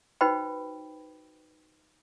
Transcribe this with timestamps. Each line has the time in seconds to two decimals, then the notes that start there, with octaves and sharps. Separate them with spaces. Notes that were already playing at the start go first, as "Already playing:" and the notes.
0.21 D#4 F#4 B4 C5 G5 B5